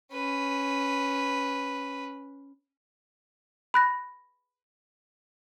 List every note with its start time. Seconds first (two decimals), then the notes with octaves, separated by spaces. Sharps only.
0.12 C#4 B4
3.74 B5 F#6 A#6